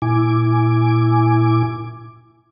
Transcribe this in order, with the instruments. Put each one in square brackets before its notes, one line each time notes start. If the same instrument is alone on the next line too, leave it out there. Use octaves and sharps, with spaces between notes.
[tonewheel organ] A#2 E4 G#5 D6